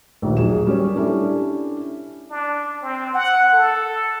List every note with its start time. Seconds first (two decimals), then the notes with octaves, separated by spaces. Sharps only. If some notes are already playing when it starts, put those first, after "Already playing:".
0.22 A#1 D#2
0.37 F#3 G#4 E7
0.67 G3 C#4 C#5
0.96 C#4 D4 E4 G4 A4 D5
2.31 D4
2.82 C4
3.14 F#5
3.53 A4